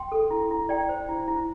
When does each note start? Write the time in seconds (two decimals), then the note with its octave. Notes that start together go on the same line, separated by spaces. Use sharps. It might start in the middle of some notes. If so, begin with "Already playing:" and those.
Already playing: G5 C6
0.12 A4
0.31 E4
0.51 E4
0.69 E4 D5 G5
0.89 C5
1.09 E4
1.28 E4